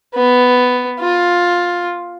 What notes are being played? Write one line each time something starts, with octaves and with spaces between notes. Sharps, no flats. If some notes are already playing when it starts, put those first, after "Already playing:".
B3
F4